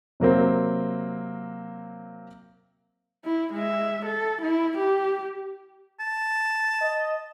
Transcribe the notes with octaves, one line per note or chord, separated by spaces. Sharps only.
C3 F#3 A#3 C4
E4
G#3 E5
A4
E4
G4
A5
D#5